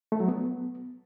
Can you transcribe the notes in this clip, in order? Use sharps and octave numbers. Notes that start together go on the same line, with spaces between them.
A3
F#3
B3